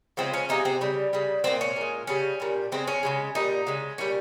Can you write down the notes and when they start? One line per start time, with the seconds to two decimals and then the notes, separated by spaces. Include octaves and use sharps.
0.17 C#3 F3 G#3 C4
0.34 C#4
0.49 C3 F3 G#3 D#4
0.65 C4
0.81 C#3 G3
1.13 C#3 G3
1.44 A#2 G#3 C4
1.61 C#4
1.76 A#2 G#3
2.07 C#3 G3 C#4
2.40 A#2 G3
2.72 C#3 G#3 C4
2.87 C#4
3.03 C#3 F3 G#3
3.35 A#2 G3 D#4
3.67 C#3 G#3
3.98 A#2 G3 C#4